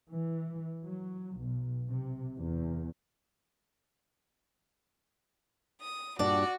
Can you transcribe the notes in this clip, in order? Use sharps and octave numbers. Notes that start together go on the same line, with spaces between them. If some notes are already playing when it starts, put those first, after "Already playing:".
E3
F#3
B1
C3
E2
D#6
G2 A#2 D4 F#4 D5